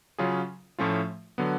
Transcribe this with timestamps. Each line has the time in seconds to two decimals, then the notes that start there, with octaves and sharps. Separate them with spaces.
0.18 C#3 F#3 C#4 F4 G#4
0.79 A2 F3 A3 C#4 F4
1.38 D3 F#3 B3